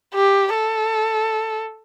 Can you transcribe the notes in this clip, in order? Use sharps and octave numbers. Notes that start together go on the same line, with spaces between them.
G4
A4